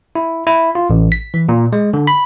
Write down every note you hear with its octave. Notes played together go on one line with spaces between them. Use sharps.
E4
E4
F4
A1
B6
E3
A#2
G#3
D3
B5